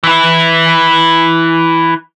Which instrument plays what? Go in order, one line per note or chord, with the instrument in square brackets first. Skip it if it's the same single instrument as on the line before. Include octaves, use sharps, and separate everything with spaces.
[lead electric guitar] E3 E4